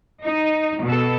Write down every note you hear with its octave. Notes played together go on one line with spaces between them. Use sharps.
D#4
B2 A4